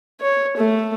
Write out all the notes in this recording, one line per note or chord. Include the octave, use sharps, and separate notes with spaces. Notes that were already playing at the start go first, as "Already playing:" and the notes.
C#5
A3